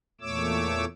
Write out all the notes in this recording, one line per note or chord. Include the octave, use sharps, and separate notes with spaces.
E2 A#2 A3 C#5 D6 E6